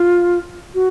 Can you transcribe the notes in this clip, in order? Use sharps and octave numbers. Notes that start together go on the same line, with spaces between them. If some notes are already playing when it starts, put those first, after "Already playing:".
Already playing: F4
F#4